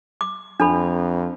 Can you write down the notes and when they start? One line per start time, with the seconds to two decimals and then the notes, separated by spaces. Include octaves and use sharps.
0.21 D6
0.60 F2 D4 A4 B5